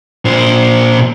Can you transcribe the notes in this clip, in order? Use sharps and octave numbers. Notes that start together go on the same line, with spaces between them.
A#2 C5